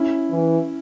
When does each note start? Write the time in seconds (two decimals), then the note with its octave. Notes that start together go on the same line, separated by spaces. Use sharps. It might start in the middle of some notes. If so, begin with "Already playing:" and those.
Already playing: C#4 E4
0.31 E3